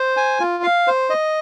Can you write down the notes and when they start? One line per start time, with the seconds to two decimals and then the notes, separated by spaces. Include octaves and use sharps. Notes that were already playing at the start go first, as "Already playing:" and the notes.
Already playing: C5
0.17 G#5
0.40 F4
0.63 F5
0.87 C5
1.10 D#5